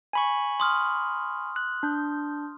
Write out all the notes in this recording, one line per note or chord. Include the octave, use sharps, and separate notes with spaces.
G#5 B5 C#6
C6 D#6 F6
F#6
D4 G6